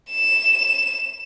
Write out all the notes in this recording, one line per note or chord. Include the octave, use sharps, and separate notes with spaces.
E7